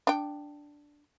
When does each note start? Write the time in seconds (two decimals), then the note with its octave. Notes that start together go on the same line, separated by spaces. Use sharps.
0.07 D4 G5